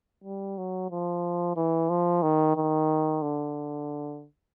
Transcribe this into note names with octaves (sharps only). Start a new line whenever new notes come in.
G3
F#3
F3
E3
F3
D#3
D#3
D3